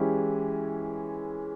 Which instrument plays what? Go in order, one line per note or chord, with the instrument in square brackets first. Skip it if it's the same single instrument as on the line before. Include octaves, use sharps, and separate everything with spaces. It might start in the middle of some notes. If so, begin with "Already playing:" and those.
Already playing: [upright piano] E3 G#3 C#4 E4 G4